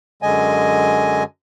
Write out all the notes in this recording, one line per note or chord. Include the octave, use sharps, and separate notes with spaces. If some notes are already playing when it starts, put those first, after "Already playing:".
F#2 D3 G#3 D#5 G#5